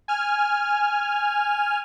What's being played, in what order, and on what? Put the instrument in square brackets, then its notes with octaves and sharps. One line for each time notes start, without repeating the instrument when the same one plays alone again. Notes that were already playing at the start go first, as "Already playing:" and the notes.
[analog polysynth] G#5 F6